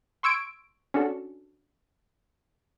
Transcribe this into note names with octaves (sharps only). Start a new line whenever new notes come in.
C6 C#6 E6 G#6 D7
C#4 D4 F#4 A4